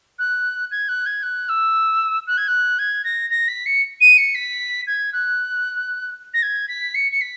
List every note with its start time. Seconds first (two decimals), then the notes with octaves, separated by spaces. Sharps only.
0.19 F#6
0.71 G#6
0.89 F#6
1.06 G#6
1.23 F#6
1.49 E6
2.27 F#6
2.37 G#6
2.48 F#6
2.79 G#6
3.04 A#6
3.30 A#6
3.48 B6
3.66 C#7
4.01 D#7
4.18 C#7
4.35 B6
4.87 G#6
5.13 F#6
6.34 A#6
6.43 G#6
6.68 B6
6.95 C#7
7.12 C#7
7.21 B6